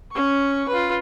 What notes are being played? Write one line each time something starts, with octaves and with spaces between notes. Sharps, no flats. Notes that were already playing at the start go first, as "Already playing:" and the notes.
C#4 C#6
F4 B4